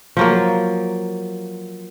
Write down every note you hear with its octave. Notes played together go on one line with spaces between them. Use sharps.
F3 F#3 A#3